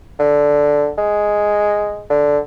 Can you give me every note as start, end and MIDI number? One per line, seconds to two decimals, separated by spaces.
0.19 0.89 50
0.98 2.04 56
2.10 2.38 50